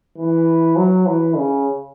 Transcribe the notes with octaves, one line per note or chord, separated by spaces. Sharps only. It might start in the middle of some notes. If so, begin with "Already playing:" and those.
E3
F#3
E3
C#3